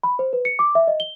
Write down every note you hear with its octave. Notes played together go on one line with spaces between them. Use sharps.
B5
C5
B4
C#7
D6
E5
D#5
G7